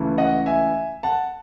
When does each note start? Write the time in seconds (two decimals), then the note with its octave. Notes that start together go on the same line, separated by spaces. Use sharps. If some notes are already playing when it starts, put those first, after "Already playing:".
Already playing: C#2 C#3 E3 A3
0.18 D#5 F#5
0.46 E5 G#5
1.03 F#5 A5